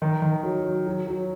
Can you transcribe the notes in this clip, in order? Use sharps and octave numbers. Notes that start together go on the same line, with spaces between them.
D#3
D#3
F#3
F#3
F#3
F#3